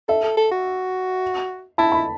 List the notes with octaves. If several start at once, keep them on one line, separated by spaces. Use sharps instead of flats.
A4 E5
A4
A4
F#4
E4 A5
B5